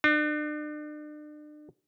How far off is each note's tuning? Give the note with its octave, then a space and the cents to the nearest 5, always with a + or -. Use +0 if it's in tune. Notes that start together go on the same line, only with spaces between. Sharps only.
D4 +40